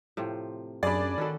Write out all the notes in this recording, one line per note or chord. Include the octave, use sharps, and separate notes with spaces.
A2 C3 F3
F#2 D4 G#4 D5 B5
D#3 C#4 F#4 A4